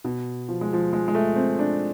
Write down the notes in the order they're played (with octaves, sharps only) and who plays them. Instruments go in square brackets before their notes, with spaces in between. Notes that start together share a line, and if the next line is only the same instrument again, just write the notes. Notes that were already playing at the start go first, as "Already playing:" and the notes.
[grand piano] B2
F3
G#3
F3
G#3
G#3
A3
C4
D4